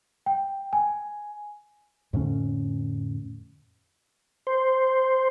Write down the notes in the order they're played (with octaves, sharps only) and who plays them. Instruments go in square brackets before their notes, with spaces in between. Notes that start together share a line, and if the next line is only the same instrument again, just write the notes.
[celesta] G5
G#5
[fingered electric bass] F2 A2 D3 C#4
[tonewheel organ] C5